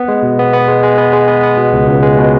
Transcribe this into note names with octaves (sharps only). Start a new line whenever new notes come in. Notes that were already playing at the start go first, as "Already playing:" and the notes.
Already playing: B3
G#3
B2
B3
B3
G#3
G#3
B3
G#3
B3
B3
B2
C#2
C#2
G#3
B2